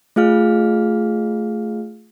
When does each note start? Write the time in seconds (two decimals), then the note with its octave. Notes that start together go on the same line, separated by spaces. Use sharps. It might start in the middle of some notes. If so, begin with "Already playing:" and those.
0.16 A3 F4 G#4 F5 F6